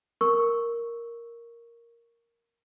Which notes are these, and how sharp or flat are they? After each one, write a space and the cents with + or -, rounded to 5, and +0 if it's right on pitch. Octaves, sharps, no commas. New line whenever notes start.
A#4 +0 C#6 +0 E6 +0